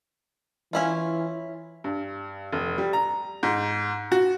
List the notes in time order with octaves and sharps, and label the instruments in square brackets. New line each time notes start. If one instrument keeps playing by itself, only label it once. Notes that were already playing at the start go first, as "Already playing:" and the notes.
[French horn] E3 [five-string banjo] C#4 E4 F4
[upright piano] G2
F1
G3
A#5
G#2
F#4